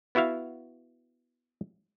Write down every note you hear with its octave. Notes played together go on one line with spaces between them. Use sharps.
B3 E4 F#4 E5 F5